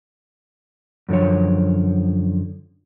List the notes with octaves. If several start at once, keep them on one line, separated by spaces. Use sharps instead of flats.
F#2 D3 F3 C#5